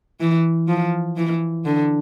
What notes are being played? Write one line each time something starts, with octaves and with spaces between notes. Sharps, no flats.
E3
F3
E3
D3